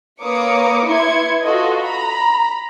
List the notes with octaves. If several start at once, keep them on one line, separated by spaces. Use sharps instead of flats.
A#3 B4 C#5 D6 D#6 C#7
E4 B4 C6 G#6 C#7
F4 F#4 A4 D#5
A#5 B5